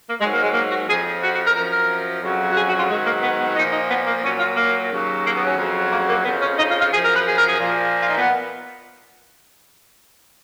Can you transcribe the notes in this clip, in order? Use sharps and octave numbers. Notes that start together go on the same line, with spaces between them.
A#3
G#2 F#3 G#3
A#3
G#3
A#3
F#4
F2 F3 G#4
F#4
F#4
A#4
F#2 F3 A#4
A#4
F2 C#3 F#3
F#4
G#4
F#4
F4
G#2 D#3 F#3 G#3
A#3
B3
B3
A#2 F3 D#4
D#4
B3
A#3
A#2 F#3 C#4
F4
A#3
D#2 C#3 F#3
A#3
B3
C#4
F2 C#3 F#3
A#3
A#3
F2 C#3 F3 B3
C#4
D#4
F4
F4
F#2 F3 G#4
A#4
B4
G#4
A#4
G#4
A#2 F3
F4
D#4
B3